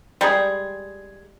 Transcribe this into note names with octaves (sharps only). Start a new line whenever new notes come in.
G3 G#3 G#4